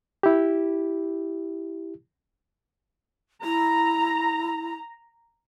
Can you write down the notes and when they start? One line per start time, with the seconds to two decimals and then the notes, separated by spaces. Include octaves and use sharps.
0.23 E4 G4
3.44 E4 A#5